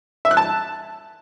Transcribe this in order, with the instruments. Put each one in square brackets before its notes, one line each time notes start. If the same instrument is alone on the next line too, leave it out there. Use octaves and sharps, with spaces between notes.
[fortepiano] E5
F#6
A5